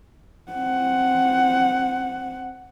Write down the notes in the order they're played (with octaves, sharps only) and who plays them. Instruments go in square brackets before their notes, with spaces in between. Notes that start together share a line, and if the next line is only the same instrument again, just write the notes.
[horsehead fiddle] C4 F#5